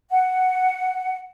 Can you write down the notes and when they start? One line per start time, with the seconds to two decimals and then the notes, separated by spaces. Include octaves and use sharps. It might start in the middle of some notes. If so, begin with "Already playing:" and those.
0.10 F#5